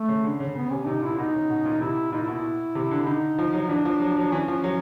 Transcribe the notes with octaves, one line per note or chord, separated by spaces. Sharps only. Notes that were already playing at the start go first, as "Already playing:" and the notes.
Already playing: A3
C#3
D3
C#3
C#3 B3
C3 C#4
C3 D#4
A#2 E4
A#2
B2 D#4
C#3
B2
A#2
C3 E4
A#2 D#4
E4
B2
E4
C3
D3
D3 D#4
F3
F#3
D#4
E3 D4
F3
F#3
F#3
E3 C#4
F3
F#3